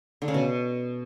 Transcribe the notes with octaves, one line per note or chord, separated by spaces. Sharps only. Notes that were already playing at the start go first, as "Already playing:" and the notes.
D3
C#3
B2